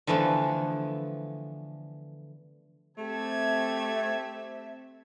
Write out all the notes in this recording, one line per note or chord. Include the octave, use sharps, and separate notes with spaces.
D3 E3 F3 A3 B3
A3 C4 G4 E5 A5 G#6